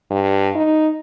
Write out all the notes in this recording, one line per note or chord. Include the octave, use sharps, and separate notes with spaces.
G2
D#4